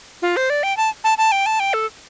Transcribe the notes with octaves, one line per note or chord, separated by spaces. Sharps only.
F4
C5
D5
G5
A5
A5
A5
G5
A5
G5
A4